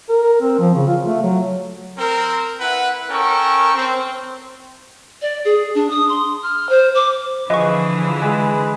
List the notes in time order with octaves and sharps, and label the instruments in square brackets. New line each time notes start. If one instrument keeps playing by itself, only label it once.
[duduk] A#4
C4
F3
C#3
F4
A3
F#3
[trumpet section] C4 A#4
E4 B4 F#5
C#4 A4 A#4 G5 C#6
C4
[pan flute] D5
G#4
D4
D#6
C6
F6
C5
D6
[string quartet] D3 E3 [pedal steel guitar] F3 G#4 B4 [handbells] D#5 C#6
[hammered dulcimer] G#3 [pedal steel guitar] G#4 B4